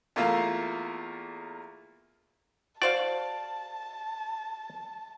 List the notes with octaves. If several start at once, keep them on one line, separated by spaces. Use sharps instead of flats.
E2 A3 A#3 F4 F5
F#4 C5 D5 F5 A5